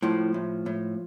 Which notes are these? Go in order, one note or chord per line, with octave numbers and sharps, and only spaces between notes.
A2 F3
A2
A2